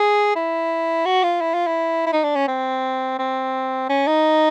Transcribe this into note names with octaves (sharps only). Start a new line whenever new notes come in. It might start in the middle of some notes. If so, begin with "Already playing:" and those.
Already playing: G#4
E4
F#4
F4
E4
F4
E4
E4
D#4
D4
C#4
C4
C4
C#4
D#4